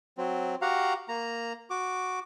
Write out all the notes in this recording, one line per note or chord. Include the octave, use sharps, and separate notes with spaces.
F#3 C4
F#4 G4 F5 F#5 A#5
A#3 A#5
F#4 D6